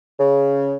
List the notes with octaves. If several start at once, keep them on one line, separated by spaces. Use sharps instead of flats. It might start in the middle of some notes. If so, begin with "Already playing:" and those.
C#3